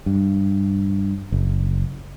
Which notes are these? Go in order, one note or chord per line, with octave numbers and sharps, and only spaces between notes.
G2
F#1